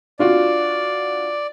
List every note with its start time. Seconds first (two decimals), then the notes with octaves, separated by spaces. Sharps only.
0.19 D4 F4 F#4 D5